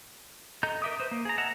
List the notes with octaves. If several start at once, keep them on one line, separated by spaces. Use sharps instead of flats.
A4 D#5 A#5 G6
A#4 D#5 E5 D6 D#6
B4 C5
A#3
G#4 A#5
D#5 E5 F#5 A5 A#5